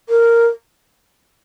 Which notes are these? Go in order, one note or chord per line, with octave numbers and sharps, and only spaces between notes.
A#4